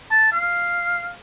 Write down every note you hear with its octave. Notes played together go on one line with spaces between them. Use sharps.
A5
F5